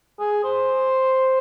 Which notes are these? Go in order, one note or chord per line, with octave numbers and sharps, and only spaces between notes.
G#4
C5